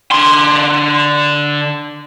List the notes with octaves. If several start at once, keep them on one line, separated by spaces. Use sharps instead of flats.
D3 C6